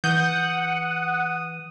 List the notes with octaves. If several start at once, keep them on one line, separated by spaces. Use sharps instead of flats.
E3 F#5 D#6 G6